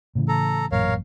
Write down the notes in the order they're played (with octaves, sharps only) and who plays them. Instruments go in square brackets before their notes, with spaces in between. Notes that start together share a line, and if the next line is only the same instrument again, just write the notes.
[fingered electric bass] A2 C#3 E3
[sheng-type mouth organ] A4 A#5
[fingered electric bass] A1 F#2 A#2 [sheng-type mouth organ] A#4 C#5 F5